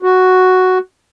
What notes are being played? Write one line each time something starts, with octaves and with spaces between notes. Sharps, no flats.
F#4